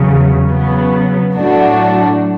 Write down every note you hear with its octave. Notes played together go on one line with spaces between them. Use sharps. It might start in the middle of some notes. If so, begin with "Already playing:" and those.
Already playing: E2 C#3 F#3
C#3 F#3 B3
A2 F#3 A3 D4 F#4